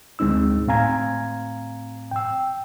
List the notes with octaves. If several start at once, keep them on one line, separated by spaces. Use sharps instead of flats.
D2 G#3 C4 D#4 E6
A2 C4 F5 G#5 A#5 G#6
G5 E6